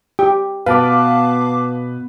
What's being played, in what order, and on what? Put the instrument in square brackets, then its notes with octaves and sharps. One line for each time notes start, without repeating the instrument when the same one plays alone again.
[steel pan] G4
[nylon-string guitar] B2 [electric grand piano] B4 [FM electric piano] F5 A5 D6